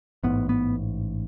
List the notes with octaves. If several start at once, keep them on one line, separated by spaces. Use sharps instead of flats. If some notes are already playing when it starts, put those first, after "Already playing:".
A1 G#2 B3
B3